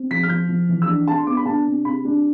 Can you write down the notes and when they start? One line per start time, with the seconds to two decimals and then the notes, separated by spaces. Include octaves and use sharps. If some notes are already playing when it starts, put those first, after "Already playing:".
Already playing: C4
0.11 F3 B6
0.23 F6
0.29 F3 G6
0.49 F3
0.69 E3
0.82 E6
0.88 D4
1.07 D4 A5
1.18 C6
1.26 B3 D6
1.37 B5
1.46 D4 A5
1.66 C3
1.85 C3 B5
2.05 D4